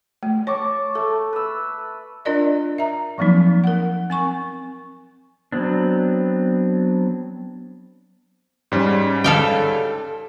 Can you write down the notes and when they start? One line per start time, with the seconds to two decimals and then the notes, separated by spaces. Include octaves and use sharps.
0.23 A3
0.47 C#5 A5 C#6 D6
0.95 A3 A4
1.33 B4 E6
2.25 D4 F4 A#4 D5 D#5
2.78 E5 A#5
3.18 F3 F#3 A#3 C4 D#4
3.64 A#4 F#5
4.10 C4 G#5 C#6
5.52 F#3 B3 C4 D4
8.72 G#2 G3 C#4
9.24 A4 F5 G5